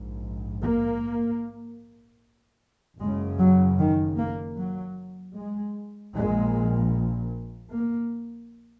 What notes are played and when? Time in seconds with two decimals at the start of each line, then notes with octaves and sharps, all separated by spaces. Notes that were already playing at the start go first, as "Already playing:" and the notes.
Already playing: A#1 G#2
0.63 A#3
3.00 F#1 F#2 C#3 G#3
3.39 F#3
3.79 D#3
4.18 A#3
4.58 F#3
5.37 G#3
6.16 A#1 A#2 G#3
7.74 A#3